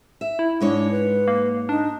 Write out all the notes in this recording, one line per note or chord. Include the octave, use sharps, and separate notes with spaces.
E5
E4
G#2 G#3 D4 C#5
B4
A#3
D4 D#4